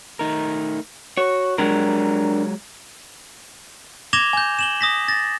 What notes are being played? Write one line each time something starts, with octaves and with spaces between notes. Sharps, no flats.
A3 D#4 A#4
F#4 C#5
F#3 G#3 D4 A#4
D6 G#6 A#6 E7 F7 G7
G#5 G6
E7 F#7 G7
D#6 A#6 B6
A6 A#6